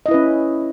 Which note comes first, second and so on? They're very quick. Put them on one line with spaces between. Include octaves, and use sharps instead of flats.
D#5 E4 B4 C#4